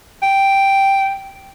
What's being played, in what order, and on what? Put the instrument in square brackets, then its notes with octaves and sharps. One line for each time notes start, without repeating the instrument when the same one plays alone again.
[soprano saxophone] G5